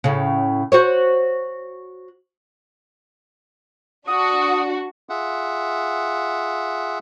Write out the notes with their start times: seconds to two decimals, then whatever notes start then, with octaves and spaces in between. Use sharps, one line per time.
0.04 A2 C#3
0.72 F#4 C5 C#5
4.07 D4 F#4 D#6
5.09 F4 G#4 E5 F#5